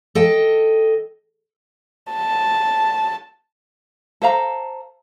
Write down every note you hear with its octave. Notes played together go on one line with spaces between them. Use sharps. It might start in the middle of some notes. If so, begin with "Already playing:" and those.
A4 D#5 G5
A5
A4 C5 F5 A#5